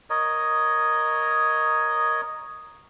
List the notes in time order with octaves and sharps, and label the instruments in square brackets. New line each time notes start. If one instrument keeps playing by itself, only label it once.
[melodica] A#4 C#5 D#5